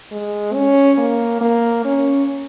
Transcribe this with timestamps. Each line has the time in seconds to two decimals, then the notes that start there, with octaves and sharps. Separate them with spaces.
0.12 G#3
0.54 C#4
0.98 A#3
1.41 A#3
1.85 C#4